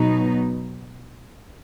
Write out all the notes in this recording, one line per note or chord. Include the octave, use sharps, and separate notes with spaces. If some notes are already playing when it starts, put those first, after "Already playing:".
Already playing: B2 F#3 B3 D#4